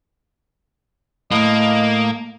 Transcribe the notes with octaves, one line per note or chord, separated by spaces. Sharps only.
A2 A#3 D#5